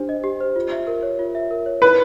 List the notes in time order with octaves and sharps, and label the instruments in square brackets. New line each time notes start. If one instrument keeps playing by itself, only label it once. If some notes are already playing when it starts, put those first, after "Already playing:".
Already playing: [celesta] D4 G4 C5
D#5
G4
C5
F4
E5
A#4
C#5
F4
E5
A#4
C#5
[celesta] E4 [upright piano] B4